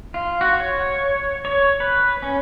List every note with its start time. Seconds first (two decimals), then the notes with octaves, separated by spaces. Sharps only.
0.14 F4
0.41 F#4
0.60 C#5
1.45 C#5
1.80 B4
2.22 C#4